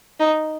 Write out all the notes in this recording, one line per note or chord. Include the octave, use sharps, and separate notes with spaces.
D#4